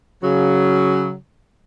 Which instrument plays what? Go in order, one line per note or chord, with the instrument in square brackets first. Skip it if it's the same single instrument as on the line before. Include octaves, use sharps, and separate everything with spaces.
[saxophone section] C#3 F#3